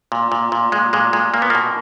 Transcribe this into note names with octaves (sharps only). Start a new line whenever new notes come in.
A#2
A#2
A#2
A#2 G#3
A#2 G#3
A#2 G#3
A#2 A#3
B3
B2 A#3